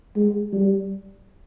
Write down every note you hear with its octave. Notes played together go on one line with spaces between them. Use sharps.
G#3
G3